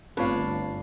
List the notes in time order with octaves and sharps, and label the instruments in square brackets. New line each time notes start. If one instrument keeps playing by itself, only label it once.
[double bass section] G1 [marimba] A3 C4 F4 [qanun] D4 [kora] B4 C#5 F5